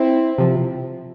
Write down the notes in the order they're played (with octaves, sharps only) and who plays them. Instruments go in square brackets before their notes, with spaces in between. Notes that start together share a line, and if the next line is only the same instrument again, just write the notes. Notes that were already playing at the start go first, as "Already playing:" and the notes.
Already playing: [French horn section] C4 E4
[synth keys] C3 F3